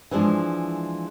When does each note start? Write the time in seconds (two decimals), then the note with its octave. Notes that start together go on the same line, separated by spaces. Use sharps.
0.11 E3 F3 G#3 D4